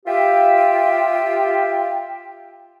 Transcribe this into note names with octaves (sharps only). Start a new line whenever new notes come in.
F4 G4 E5 G5